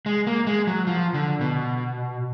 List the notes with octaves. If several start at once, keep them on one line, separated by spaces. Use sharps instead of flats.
G#3
A#3
G#3
F#3
F3
D3
B2